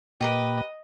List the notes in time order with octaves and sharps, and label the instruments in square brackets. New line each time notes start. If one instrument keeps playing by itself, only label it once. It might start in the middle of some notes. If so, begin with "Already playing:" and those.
[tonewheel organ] A#2 [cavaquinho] G4 A#4 B4 [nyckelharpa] D#5